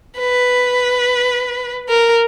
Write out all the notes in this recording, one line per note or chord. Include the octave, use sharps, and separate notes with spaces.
B4
A#4